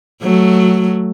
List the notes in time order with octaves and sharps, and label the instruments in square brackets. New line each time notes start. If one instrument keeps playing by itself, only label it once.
[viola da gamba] F#3 A3